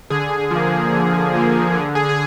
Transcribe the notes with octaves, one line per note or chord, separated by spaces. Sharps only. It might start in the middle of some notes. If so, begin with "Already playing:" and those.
D3 G#4
F3 A#3
D3
F3 A#3
D3
G#4
G#4